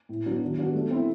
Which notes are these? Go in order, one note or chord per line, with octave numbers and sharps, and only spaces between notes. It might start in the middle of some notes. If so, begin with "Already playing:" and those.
A2
F#3 B3 D4
D#3
G3 B3 D4 F#4
A3
C4 E4